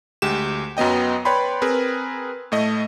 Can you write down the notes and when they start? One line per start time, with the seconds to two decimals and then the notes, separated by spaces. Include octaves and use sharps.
0.22 D2 G#3 G4 E7
0.77 F#2 F#3 B3 D#5 G5
1.25 B4 C#5 D5 G5 B5 C6
1.62 C4 G#4 A#4 B4
2.52 A2 A3 D#5